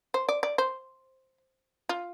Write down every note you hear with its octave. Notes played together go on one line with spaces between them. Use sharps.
C5
D5
D5
C5
F4